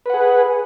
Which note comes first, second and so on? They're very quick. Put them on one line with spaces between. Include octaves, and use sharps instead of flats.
B4 F#5 G#4